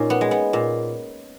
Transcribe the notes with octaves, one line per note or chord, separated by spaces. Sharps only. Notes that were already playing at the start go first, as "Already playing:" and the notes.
Already playing: A#2 C#4 D#4
B3
G#3
B3
A#2